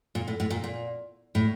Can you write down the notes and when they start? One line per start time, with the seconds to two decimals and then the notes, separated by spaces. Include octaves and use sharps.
0.15 A#2
0.28 A2
0.40 A2
0.50 A#2
0.64 A#2
1.35 A2